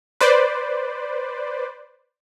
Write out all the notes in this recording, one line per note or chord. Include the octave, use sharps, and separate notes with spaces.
B4 C5 D5